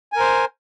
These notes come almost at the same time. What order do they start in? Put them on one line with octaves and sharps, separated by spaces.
G#5 A#4 C5